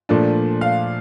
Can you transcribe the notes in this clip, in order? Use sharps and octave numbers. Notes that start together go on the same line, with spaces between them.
A#2 F3 A3 D4
F5